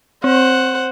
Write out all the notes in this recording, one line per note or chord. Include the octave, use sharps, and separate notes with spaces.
C4 C5 F#5